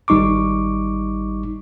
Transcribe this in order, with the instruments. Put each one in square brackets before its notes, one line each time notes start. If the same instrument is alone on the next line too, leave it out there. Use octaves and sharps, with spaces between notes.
[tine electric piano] G#1 G3 D#4 C#6 D6